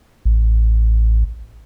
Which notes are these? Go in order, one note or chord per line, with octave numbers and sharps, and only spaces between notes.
A1